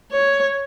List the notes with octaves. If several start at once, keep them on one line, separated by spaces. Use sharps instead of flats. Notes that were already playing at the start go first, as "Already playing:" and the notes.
C#5